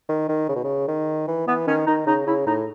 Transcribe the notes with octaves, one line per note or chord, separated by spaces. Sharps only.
D#3
D#3
C#3
B2
C#3
D#3
E3
E3 B3
D#3 C#4
D#3 D#4
C#3 D#4
C#3 E4
A2 D#4